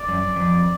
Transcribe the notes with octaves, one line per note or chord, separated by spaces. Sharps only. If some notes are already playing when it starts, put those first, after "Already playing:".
Already playing: D5
F#2
F2